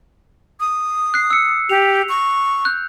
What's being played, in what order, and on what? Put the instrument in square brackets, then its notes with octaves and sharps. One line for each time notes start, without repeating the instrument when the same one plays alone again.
[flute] D#6
[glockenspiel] F#6 C7
E6 C#7
[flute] G4 [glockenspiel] F7
[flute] C#6
[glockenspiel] F#6 G6